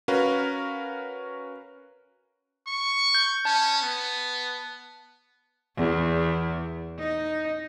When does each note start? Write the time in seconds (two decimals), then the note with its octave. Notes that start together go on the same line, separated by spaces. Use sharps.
0.08 C#4 F#4 A#4 B4 F5
2.67 C#6
3.14 G6
3.45 C#4 A5
3.82 B3
5.77 E2
6.99 D#4